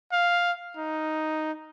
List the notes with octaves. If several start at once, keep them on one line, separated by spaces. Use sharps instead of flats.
F5
D#4